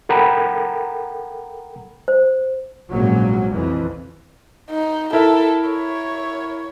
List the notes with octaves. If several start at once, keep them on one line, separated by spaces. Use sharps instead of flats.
A4 A#4 F#5 G5 A#5 B5
C5
A#1 G#2 C3 F#3 A#3 C#4
F2 E3
D#4
E4 A4 A#4 E5
C#5